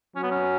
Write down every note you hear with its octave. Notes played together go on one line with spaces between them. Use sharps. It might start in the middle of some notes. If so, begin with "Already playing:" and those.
F#3 C#4
B3
C#4